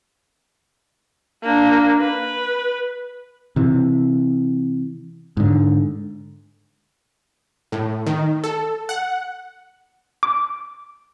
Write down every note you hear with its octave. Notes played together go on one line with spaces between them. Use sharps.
A#3 D4
B4
C3 E3
G#2 D3
A2
D#3
A4
F#5
D6